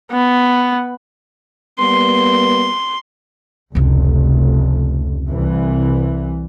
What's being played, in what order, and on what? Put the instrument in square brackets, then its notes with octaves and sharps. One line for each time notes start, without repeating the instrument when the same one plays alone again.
[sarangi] B3
[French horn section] G3 A#3 B3 [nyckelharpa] C6
[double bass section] F1 [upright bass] C#2 C3
[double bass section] C2 E3